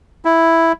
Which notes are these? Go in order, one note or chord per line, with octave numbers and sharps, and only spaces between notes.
E4